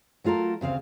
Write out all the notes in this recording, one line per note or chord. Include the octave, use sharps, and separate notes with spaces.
F#3 A3 F4 A4 A#4
D2 C#3 C4 F5